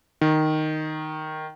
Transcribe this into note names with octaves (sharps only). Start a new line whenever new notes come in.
D#3